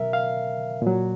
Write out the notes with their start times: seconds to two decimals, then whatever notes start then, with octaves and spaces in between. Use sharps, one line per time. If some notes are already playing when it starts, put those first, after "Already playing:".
Already playing: B2 F#3 A#4 E5
0.13 F5
0.82 A#2 F#3